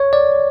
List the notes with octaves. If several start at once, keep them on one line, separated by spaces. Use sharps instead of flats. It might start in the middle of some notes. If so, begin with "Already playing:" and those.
Already playing: C#5
D5